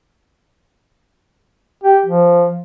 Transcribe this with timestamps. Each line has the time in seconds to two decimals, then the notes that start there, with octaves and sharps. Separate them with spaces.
1.83 G4
2.06 F3